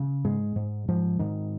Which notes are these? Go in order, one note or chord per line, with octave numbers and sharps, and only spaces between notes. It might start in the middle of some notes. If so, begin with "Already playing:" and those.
Already playing: C#3
G#2 G#3
G#2
G#2 F3
G#2 D#3